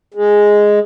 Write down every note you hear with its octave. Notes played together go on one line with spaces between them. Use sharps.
G#3